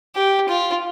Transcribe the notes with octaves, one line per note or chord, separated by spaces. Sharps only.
G4
F4